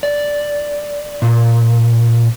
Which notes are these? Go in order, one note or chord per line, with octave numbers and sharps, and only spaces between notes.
D5
A#2